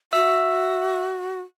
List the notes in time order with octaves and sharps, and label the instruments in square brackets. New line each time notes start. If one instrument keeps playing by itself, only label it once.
[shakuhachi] F#4 [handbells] E5 E6